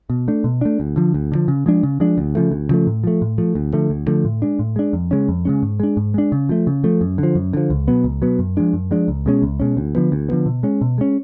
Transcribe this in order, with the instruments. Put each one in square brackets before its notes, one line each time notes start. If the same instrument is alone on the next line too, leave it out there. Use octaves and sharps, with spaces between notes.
[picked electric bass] B2
A3 D4
B2
A3 D4
D2
D3 F3
D2
D3 F3
C#3
F3 G#3 D4
C#3
F3 G#3 D4
D2
C#3 F3 A3
D2
C#3 F3 A3
A2
F3 A3
A2
F3 A3
D2
D3 F3 A3
D2
D3 F3 A3
A2
G#3 D4
A2
G#3 D4
F2
C#3 G#3 C#4
F2
C#3 G#3 C#4
G#2
G#3 D4
G#2
G#3 D4
C#3
F3 A3
C#3
F3 A3
F#2
D3
F3
F#2
D3 F3
C#2
B2 F#3 B3
C#2
B2 F#3 B3
F#2
F3 G#3 D4
F#2
F3 G#3 D4
C#2
B2 G#3 C#4
C#2
B2 G#3 C#4
D2
D3 F3 B3
D2
D3 F3 B3
B2
G#3 C#4
B2
G#3 C#4